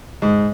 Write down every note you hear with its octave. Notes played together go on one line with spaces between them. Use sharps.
G#2